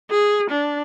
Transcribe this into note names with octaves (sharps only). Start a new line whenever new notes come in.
G#4
D4